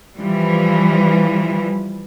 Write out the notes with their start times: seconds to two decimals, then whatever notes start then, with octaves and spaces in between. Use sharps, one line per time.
0.16 E3 F3 G3